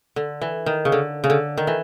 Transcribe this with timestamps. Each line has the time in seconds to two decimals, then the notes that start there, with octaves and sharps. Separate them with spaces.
0.16 D3
0.42 E3
0.66 D#3
0.85 C#3
0.92 D3
1.24 C#3
1.30 D3
1.57 D#3
1.67 E3